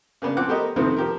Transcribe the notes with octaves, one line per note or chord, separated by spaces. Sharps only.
C#3 A#3 B3 D4
F3 C4 F#5 D6 F#6
A3 B3 G4 A#4 C5 D#5
F2 C3 D#3 F3 A3 B3
F3 G4 A#4